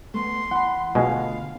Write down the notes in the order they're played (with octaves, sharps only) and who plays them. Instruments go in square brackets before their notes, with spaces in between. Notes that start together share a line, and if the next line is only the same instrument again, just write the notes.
[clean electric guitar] A3 B3 [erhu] C6
[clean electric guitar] E3 [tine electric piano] F#5 B5
[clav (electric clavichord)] B2 G#3 [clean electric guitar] D3 A3 F4 [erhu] F5